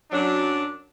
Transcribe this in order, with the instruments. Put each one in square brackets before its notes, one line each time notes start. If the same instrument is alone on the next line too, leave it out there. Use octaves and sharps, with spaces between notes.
[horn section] F#2 F#3 D4